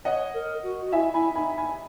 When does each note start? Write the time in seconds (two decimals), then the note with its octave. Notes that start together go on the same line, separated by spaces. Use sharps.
0.05 C#5 D#5 F#5
0.34 A#4
0.63 F#4
0.86 F#4
0.93 E4 E5 G#5
1.14 E4 G#5 B5
1.36 D#4 G#5 B5
1.57 G#5 B5